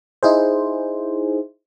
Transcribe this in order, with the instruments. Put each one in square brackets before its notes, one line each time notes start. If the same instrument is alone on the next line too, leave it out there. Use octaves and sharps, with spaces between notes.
[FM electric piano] D#4 E4 G#4 C5